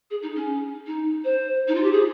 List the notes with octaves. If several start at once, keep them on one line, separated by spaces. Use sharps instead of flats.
G#4
D#4
C#4
D#4
C5
D#4
F4
G4
G#4